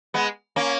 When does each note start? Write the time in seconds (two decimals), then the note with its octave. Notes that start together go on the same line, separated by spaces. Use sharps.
0.14 G#3 B3
0.56 A#3 C#4